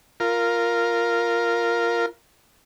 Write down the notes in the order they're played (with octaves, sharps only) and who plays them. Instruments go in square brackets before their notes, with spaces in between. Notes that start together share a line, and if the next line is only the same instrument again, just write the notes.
[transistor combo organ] F4 A#4